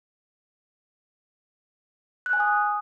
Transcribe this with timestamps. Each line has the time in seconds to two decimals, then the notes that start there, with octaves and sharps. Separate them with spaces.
2.26 F#6
2.33 G#5
2.40 D#6